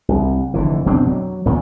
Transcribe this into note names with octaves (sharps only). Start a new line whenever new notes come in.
C2
F1 D3 E3
F2 B2 C4 D4
F#3
C#2 A#2 D#3